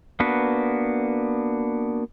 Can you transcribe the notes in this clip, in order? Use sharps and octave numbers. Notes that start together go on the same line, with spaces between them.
A#3 B3 D4 F#4 B4